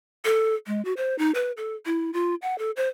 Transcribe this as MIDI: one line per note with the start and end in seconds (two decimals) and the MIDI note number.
0.25 0.55 69
0.67 0.83 56
0.85 0.93 66
0.97 1.17 72
1.18 1.31 63
1.35 1.52 71
1.57 1.75 69
1.86 2.11 64
2.14 2.35 65
2.42 2.58 78
2.58 2.71 69
2.77 2.88 72